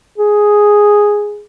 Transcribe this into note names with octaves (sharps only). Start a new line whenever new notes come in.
G#4